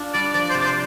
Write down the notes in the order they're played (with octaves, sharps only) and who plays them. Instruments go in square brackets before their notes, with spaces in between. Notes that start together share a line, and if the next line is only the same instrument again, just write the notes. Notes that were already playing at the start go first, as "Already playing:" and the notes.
Already playing: [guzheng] D4 F4
[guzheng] G3 [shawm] D5
[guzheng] F3 [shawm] D5
[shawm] D5
C5
[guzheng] C3
[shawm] D5
C5